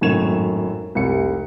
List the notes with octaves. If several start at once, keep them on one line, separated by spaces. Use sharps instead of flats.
G#1 F#2 A2 G#6 E7 F7
F1 C2 E5 C#7